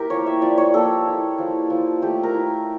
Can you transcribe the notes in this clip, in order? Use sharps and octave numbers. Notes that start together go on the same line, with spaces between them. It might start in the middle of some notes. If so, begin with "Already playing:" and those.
Already playing: A#3 E4 G4 A#4
F3 C#5
E5
F3 D5
C#5
A#3 A4
E4
F3
F3
A3 G4
A#4
E4